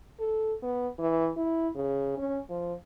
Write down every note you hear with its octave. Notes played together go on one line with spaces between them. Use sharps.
A4
B3
E3
E4
C#3
C#4
F3